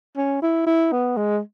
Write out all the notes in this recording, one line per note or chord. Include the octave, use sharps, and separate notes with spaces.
C#4
E4
E4
B3
G#3